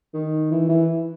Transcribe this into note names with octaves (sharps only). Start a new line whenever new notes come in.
D#3
E3
E3